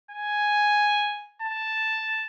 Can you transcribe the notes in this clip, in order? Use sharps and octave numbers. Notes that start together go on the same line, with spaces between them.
G#5
A5